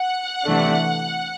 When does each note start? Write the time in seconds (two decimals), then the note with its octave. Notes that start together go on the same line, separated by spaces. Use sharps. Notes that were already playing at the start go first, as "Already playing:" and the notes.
Already playing: F#5
0.45 C3 E3 A3 D4